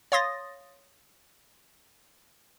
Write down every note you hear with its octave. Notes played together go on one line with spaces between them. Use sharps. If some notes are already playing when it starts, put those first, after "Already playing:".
C#5 F5 C6 D#6 A6 A#6